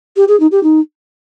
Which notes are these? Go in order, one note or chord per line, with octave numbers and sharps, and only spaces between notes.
G4
G#4
D#4
G4
D#4